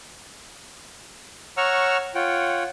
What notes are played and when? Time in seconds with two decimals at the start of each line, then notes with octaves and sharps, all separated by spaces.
1.57 C#5 F#5 A#5 C#6 E6 F6
2.15 F4 C#5 F#5 G5